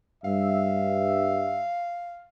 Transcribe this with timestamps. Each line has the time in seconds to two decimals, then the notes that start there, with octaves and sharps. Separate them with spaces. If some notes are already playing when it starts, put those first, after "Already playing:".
0.24 G2 E5 F5